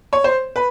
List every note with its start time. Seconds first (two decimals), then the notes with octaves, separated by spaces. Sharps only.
0.13 C#5
0.24 C5
0.56 B4